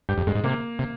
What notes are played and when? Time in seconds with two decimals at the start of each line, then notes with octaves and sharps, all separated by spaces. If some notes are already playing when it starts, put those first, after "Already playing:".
0.09 G2 G4
0.18 F2
0.27 G2 G#3
0.35 G#2
0.44 C3 A#3
0.79 C3